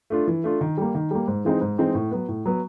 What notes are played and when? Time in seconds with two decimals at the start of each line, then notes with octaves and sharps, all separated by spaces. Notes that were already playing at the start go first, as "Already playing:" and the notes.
0.10 A3 D4 F4
0.27 E3
0.44 A3 D4 F4
0.61 D#3
0.77 G3 A#3
0.95 D#3
1.11 G3 A#3
1.28 G#2
1.45 E3 G#3 C4 D#4
1.61 G#2
1.78 E3 G#3 C4 D#4
1.95 A2
2.11 F#3 B3
2.28 A2
2.45 F#3 B3